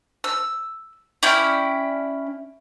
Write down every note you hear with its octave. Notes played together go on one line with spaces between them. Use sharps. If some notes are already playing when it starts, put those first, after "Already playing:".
E6
C#4 E4 D5 G5